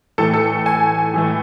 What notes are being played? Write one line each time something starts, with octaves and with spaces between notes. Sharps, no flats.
A2 E3 A3 A4
A4
G#5
A2 E3 A3